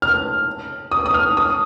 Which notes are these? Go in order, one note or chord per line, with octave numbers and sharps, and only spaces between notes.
F6
D#6
D#6
F6
D#6